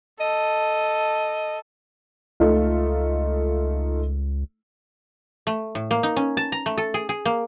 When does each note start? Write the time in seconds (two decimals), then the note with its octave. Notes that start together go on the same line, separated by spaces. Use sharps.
0.21 A4 D#5
2.40 C#2 A3 D#4 F4
5.47 A3
5.75 A2
5.91 A#3
6.03 D#4
6.16 C#4
6.37 A5
6.52 A#5
6.66 A3
6.78 A4
6.94 G#4
7.09 G#4
7.25 A#3